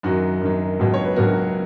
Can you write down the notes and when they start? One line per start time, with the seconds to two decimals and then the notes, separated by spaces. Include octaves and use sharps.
0.03 F#2 D#3 F#3 F#4
0.41 F#2 D#3 F#3
0.79 C#2 B2 F#3
0.94 C#5
1.05 B4
1.16 C#2 B2 F#3 F#4 A#4